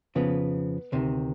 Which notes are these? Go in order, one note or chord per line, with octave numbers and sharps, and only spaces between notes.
F2 C#3 F3 B3
D2 C3 D#3